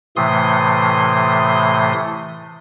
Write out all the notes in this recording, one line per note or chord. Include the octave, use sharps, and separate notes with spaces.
A2 C3 E3 A3 C6 D#6